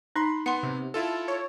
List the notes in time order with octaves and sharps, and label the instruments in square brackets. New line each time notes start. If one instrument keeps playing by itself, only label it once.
[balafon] D#4 [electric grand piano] B5 C6 F#6
[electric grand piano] B3 [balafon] F#5 C6
[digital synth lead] C3
[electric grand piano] E4 F4 A4 [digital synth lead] A5
[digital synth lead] C#5